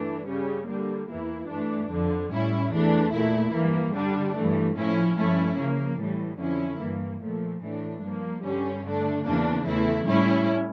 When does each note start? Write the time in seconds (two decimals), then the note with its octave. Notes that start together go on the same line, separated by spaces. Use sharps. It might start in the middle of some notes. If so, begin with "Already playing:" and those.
Already playing: G2 E3 A3 D4
0.27 C#3 G3 C#4
0.67 D3 G3 A#3
1.07 E2 E3 A#3 E4
1.48 G2 E3 A3 D4
1.90 F2 D3 F3
2.31 A2 G3 C#4 E4
2.71 E2 E3 A3 D4
3.12 A#2 A3 E4
3.53 G2 E3 A#3
3.94 D3 G3 D4
4.35 G2 E3 A3
4.77 A2 F3 C#4 E4
5.17 G2 F3 A3 C#4 E4
5.57 C#3 F3 A#3
5.99 A2 E3 G3
6.39 F2 D3 F3 C#4 E4
6.80 G2 E3 A#3
7.21 A#2 F3 A3
7.62 A2 E3 A3 D4
8.02 G2 F3 A#3
8.44 G2 D3 G3 C#4
8.85 D3 A3 D4
9.25 E2 C#3 E3 A#3 D4
9.66 E2 E3 A3 E4
10.07 A2 G3 C#4 E4